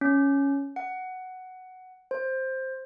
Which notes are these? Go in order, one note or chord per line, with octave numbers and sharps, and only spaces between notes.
C#4
F#5
C5